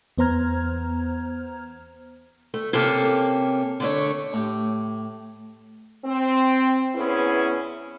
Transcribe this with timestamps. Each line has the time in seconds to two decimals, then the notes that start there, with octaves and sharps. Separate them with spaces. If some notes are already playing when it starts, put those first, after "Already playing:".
0.18 E2 B3 C5 A#5 F6 G#6
2.54 A3
2.73 C3 A#3 C#4 A4
3.80 D3 A3 C#5
4.33 A2 G4
6.04 C4
6.95 E2 B3 C#4 E4 G#4 B4